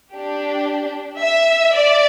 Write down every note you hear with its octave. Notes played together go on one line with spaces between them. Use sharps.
D4 G4
E5
D5